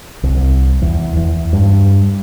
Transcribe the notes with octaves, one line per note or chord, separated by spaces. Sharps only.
C2
E2
E2
G2